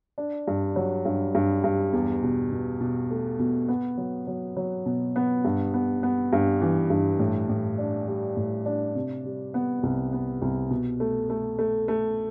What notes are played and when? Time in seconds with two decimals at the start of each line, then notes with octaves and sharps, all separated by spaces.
0.18 D4
0.48 G2
0.76 F#3
1.05 G2
1.35 G2
1.64 G2
1.93 E2
2.23 B2
2.52 B2
2.80 B2
3.11 A3
3.39 B2
3.68 B3
3.98 F#3
4.27 F#3
4.57 F#3
4.86 B2
5.16 B3
5.45 G2
5.74 B3
6.03 B3
6.33 G2
6.62 E3
6.90 G2
7.19 A2
7.49 A2
7.78 D4
8.08 G3
8.37 A2
8.66 D4
8.95 C3
9.25 G3
9.54 B3
9.83 C2
10.13 B3
10.42 C2
10.70 B2
11.00 A3
11.30 A3
11.59 A3
11.88 A3